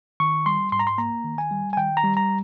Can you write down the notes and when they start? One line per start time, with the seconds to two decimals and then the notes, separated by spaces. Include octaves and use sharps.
0.20 D#3 C#6
0.46 G3 C6
0.72 G#2 C6
0.80 A#5
0.87 C6
0.98 A#3 A#5
1.25 D#3
1.38 G#5
1.51 G3
1.73 G#5
1.77 D#3 G5
1.97 A#5
2.04 G3
2.17 A#5